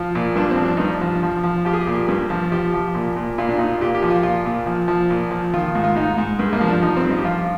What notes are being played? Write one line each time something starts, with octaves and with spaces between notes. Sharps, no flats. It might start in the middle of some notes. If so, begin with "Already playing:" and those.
Already playing: F3 F4
A#2
G2 D4
C4
F3
D4
G2 D#4
D4
F3
F3
F3
F3 G4
G#4
G4
A#2
G2
F3
F3 G4
F3
A#2
A#2
A#2 F4
D4
A#2 D#4
F4
A#2 G4
G4
F3
F4
A#2 F4
A#2
F3
F3
A#2
F3
D#3 F4
G#2
F4
G#2 D#4
G#2
G2
G#3
A#3
F3
D4
F3 D#4
C4
G2
D#4
G4
F3 F4